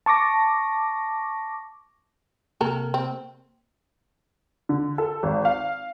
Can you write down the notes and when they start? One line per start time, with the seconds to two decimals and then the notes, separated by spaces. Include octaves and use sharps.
0.06 A5 C#6 D6 A#6
2.61 C3 A#3 A4 A#4
2.94 C4
4.69 D3
4.98 A4
5.23 G#1
5.45 F5